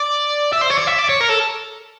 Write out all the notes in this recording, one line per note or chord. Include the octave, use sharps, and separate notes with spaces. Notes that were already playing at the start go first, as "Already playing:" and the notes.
Already playing: D5
E5
C5
C#5
D5
E5
D5
C#5
A#4
A4